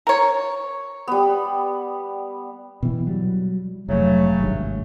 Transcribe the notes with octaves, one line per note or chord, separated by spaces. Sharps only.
A#4 C#5
G3 B3
B2 E3
F#3 G3
F1 G#2 C#3 F#3 A3
G#1 G2